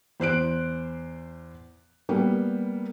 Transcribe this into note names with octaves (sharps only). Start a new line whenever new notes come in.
E2 C5 F#6 D7
G3 A#3 B3